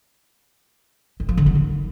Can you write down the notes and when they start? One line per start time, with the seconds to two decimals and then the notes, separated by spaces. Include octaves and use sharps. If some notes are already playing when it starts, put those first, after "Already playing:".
1.20 E3
1.29 F3
1.37 D3
1.46 F#3
1.55 D#3